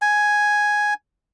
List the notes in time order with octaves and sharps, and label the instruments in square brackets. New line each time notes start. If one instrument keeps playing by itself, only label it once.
[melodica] G#5